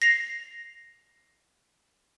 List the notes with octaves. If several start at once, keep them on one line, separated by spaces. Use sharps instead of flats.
A#6 C7 F7